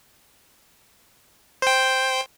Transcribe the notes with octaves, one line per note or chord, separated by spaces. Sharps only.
C5 G5